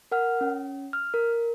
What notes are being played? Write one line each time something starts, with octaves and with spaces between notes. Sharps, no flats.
A#4 F#5 F6
C#4
F6
A#4